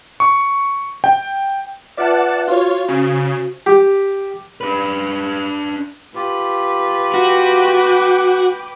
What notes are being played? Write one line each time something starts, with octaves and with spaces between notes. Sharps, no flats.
C#6
G5
F4 B4 D5 E5 F#5 A5
F4 F#4 C5 C#5
C#3
G4
D4 B4
F4 G4 B4
F#4 G5 D6